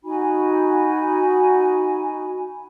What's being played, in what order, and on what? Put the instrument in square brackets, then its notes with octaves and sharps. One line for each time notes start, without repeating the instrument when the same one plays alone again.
[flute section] D#4 F#4 G#5 B5